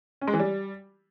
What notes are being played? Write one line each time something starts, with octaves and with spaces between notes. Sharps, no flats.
C#4
G#3
E3
G3